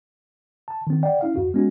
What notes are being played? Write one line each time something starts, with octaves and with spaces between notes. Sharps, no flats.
A5
D#3 C4
D5 F#5 G5
C#4 E4 F5
F2 F#4
G#3 B3 C#4 F#4